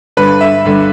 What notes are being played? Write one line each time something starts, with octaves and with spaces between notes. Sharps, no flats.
G2 D3 B4
E5
G2 D3